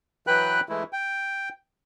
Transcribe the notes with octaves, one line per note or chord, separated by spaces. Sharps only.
E3 F#3 B4 G5 B5 F#6
E3 G#3 A3 E4
G5